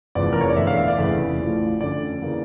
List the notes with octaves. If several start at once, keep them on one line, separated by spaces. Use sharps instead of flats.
F1 E2 C#3 F3 D5
A#4
C#5
D5
E1 E2 D3 A3 E5
F5
E5
D5
F1 E2 C#3 E3 A3
A1 A2 F3
F2 D3 A3 C#4 D5
C#3 E3 A#3